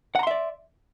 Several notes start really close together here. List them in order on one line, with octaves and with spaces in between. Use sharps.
F#5 A#5 C6 E5 D5